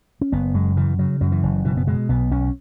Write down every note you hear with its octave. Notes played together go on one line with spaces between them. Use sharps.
C#4
F#1 B3
F#2 G#3
C#3 E3
C#3 F#3
F#2 F#3
E3
F#1
B2 E3
B3
B2 G#3
B1 B3
B1 C#4